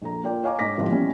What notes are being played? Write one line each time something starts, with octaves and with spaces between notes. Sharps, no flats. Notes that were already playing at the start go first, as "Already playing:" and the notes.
A#1 A4 A#5
A#3 F4 D5 G5
C#5 D#5 F5 G#5 A#5 D6
G#2 D4 D6 A#6 B6
G#1 A2 F3 G4
E3 G3 B3 C#4